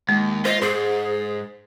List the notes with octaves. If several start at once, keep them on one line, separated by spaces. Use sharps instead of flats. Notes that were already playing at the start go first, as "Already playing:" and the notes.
D#2 G#3
F4 C5 D#5
G#2 G#4 C5